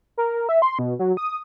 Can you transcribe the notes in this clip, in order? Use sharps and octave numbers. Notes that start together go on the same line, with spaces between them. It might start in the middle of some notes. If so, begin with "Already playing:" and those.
A#4
E5
C6
B2
F#3
D#6